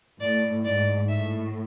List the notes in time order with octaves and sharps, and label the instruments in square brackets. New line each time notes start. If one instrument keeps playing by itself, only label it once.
[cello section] A2 [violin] D5
[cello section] G#2 [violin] D5
[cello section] A2 [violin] E5